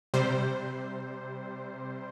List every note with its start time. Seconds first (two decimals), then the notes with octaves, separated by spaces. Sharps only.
0.14 C3 G3 C5